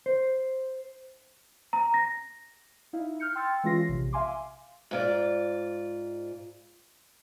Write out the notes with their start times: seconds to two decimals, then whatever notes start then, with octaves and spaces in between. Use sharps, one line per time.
0.06 C5
1.73 A#5
1.94 A#6
2.93 D#4 E4 F5
3.20 F6 G6 C#7
3.35 G5 C6 E6 F6 A6
3.64 E3 G#3 C#4 F4 A#6 C7
3.89 A#1 C3
4.13 E5 F5 G#5 C6 D6
4.91 G#2 F4 D5